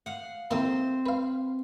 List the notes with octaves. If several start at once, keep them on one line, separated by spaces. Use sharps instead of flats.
F5 F#5
D#2 A3 A#3 C4
B4 F5